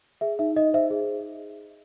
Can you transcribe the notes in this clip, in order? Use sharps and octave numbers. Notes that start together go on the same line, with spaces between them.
G#4 E5
D#4 E5
D#4 D#5
C5 E5
G#4